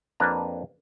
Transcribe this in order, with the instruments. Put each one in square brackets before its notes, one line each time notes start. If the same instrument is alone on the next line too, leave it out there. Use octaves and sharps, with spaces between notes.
[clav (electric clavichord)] F2 A#3 D4 B4 A#5